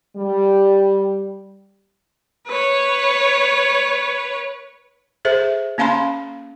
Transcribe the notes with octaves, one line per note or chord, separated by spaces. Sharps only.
G3
B4 C#5
G#4 A4 C5 E5
A#3 C#4 F5 A5 B5 C6